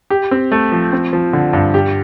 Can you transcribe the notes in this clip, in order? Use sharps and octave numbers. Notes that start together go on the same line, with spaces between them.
G4
C4
A3
F3
C4
F3
D3
G2
G4